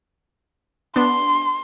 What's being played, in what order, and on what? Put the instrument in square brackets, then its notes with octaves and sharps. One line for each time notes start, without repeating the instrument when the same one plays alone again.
[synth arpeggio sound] B3 D4 [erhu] C6